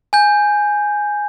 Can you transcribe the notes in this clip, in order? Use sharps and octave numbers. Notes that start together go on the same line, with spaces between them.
G#5 G6